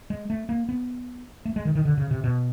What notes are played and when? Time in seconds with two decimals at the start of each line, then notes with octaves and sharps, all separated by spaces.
0.10 G#3
0.30 A3
0.49 A#3
0.69 B3
1.45 A3
1.56 G#3
1.65 D#3
1.75 D#3
1.85 D3
1.97 C#3
2.11 C3
2.24 B2